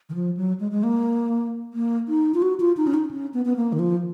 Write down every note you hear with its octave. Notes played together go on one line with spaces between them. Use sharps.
D#3
F3
F#3
G#3
G#3
A#3
A#3
D#4
F4
F#4
F4
D#4
C#4
D#4
C#4
B3
B3
A#3
D#3
F3